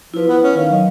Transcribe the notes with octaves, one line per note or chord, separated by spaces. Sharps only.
F3 E4 B4
B3
C#4
D#3 F5
F#3 D#5